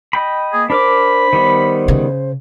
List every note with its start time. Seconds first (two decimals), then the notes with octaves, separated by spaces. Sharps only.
0.13 D#5 G5 B5
0.53 A#3 G#4
0.70 D4 A#4 C5 B5 D6
1.33 D#3 G3 B3
1.88 C#3